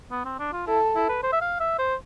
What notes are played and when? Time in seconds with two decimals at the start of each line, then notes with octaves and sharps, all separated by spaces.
0.11 B3
0.25 C4
0.39 D4
0.53 F4
0.67 E4 A4
0.96 E4
1.09 B4
1.23 C5
1.33 E5
1.41 F5
1.60 E5
1.79 C5